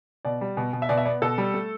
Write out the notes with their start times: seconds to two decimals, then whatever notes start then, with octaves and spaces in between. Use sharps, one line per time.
0.25 B2 D5
0.41 G3
0.57 B2
0.73 B2
0.82 E5
0.89 B2 D5
0.98 E5
1.05 B3 D5
1.22 B2 A4
1.38 G3
1.54 A3